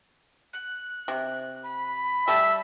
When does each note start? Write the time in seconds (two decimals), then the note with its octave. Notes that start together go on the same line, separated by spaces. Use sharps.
0.53 F#6
1.08 C3
1.63 B5
2.28 G3 A3 A4 E5